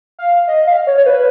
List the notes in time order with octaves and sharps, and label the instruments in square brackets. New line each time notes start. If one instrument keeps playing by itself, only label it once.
[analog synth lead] F5
D#5
F5
C#5
C#5
B4